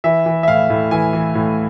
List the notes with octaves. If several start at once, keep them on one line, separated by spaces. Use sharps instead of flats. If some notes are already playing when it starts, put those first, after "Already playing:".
E3 E5
E3
E5
A2 F5
A2
E3 G#5
E3
A2